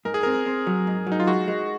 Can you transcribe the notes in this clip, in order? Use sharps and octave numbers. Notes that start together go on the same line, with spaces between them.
G#2 A#4
G#4
C4 A#4
C4
F#3
G#2
F#3
D#4
F4
G#3 F#4
G#3